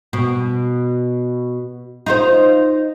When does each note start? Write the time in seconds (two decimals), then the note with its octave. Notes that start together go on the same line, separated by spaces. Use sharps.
0.13 B2
2.06 D#4 F4 C5